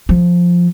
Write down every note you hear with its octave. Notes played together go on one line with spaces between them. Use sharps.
F3